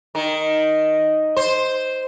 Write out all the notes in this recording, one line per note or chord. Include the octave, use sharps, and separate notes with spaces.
D#3
C5